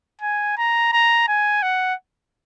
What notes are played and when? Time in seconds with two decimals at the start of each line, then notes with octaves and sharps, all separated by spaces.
0.21 G#5
0.58 A#5
0.92 A#5
1.28 G#5
1.62 F#5